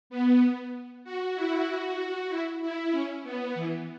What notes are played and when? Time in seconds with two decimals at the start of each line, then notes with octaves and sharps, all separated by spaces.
0.10 B3
1.04 F#4
1.35 E4
1.67 F#4
1.98 F#4
2.29 E4
2.62 E4
2.92 C#4
3.24 B3
3.55 E3